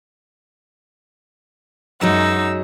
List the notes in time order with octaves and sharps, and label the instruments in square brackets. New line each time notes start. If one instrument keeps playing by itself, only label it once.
[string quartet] F#2 D#4 E6 [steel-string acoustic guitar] F#3 G#3 F#4